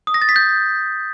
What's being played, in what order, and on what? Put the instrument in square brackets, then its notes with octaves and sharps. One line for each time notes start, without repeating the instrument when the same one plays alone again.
[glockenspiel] D#6
A#6
A6
B6
G6